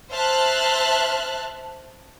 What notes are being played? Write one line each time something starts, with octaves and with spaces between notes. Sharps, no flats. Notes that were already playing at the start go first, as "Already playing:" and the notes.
C5 E5 A5 F6 F#6